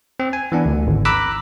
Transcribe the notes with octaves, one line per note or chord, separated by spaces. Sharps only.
C4
G#5
E3 B3 D4
D2
G#1
A#5 B5 D6 E6 F#6